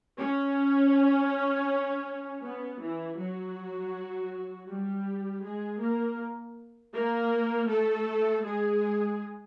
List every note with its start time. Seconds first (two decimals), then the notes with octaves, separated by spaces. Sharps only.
0.19 C#4
2.44 B3
2.81 E3 E4
3.19 F#3 F#4
4.68 G3 G4
5.44 G#3 G#4
5.81 A#3 A#4
6.94 A#3 A#4
7.69 A3 A4
8.44 G#3 G#4